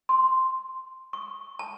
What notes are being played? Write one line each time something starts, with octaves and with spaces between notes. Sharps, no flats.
C6
C#6
A5